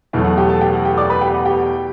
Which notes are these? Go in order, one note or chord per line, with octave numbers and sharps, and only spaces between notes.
E2 B2 F#3 A3
F#5
G4 G5
A4 A5
G4 G5
F#5
G4 G5
D5 D6
B4 B5
G4 G5
F#5
G4 G5